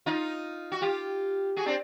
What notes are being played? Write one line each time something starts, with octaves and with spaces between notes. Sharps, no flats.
D#4 F4
F#4
F4 G4
F#4 G#4
C4 D4